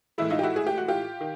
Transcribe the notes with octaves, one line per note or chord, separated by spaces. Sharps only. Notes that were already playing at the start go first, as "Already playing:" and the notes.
A2 E3 G#3 E4
D#4 F4
G4
E4 F#4
G#4
G4
F#4
F4 G4
D#3